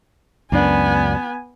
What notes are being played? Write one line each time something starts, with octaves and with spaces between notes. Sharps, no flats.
C#2 F#2 B3 D4 G#5